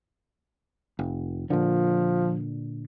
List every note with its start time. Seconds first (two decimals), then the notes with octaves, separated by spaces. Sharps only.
0.99 F1
1.50 A#2 D3 F3